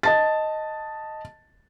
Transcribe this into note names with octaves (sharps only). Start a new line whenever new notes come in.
D#5 A5 A6